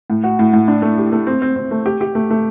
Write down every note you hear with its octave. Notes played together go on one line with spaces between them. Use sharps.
A2
F#4
A2
A2
D4
A3
G4
A3
C4
C4
C4
A3
G4
G4
A3
A3